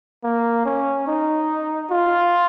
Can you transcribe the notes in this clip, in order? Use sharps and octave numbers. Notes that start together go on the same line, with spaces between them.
A#3
C#4
D#4
F4